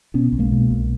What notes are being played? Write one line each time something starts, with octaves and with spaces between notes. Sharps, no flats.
B2 B3 C#4
B1
G#3 A#3
B2
B1